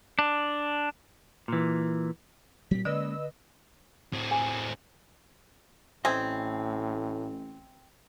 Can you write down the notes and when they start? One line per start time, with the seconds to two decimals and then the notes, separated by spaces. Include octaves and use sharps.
0.19 D4
1.48 A#2 E3
2.71 A#2 F#3 G3 C4 B6
2.85 D3 G#3 A#3 C#4 B4 D5 D#5 E6
4.13 A2 C4
4.31 G#5
6.05 A1 A2 C4 D#5 E5 G#5